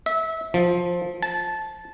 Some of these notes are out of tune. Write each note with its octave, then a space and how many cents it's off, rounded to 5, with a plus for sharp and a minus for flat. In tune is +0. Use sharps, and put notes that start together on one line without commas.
E5 -25
F3 +10
A5 -15